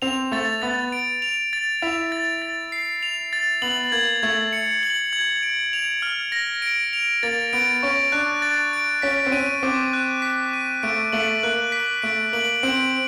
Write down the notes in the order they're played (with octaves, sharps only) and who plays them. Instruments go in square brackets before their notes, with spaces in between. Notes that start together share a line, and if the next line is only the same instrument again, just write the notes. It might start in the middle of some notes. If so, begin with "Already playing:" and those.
[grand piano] C4 [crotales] F7
[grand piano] A3 [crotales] A6
[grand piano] B3 [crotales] A6
[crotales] D7
F7
A6
[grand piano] E4 [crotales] F7
[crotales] A6
A6
C7
F7
A6
[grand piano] B3 [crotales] F#7
[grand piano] A#3 [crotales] G#6
[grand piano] A3 [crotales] G#6
[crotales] C#7
F#7
G#6
D7
F7
F6
A#6
D7
F7
[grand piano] A#3 [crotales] A6
[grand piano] B3 [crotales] D7
[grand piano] C#4 [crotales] C#6
[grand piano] D4 [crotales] F#6
[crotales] A6
D7
[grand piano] C#4 [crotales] B6
[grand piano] C4
[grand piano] C#4 [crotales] D#7
[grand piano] C4 [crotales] D6
[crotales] F#6
B6
D#7
[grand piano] A3 [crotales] D7
[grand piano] A3 [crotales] F#7
[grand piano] A#3 [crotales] F#6
[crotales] B6
[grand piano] A3 [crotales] D7
[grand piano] A#3 [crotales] F#7
[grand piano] C4 [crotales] D7